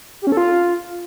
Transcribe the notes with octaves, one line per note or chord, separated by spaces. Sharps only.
G4
C#4
A4
F4